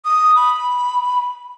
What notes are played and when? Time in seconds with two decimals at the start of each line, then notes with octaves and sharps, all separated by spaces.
0.05 D#6
0.36 B5